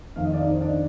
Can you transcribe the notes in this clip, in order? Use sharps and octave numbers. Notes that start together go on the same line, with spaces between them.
F2 D#3 F5
D#5
D5
D#4 D#5
C5
D4 D5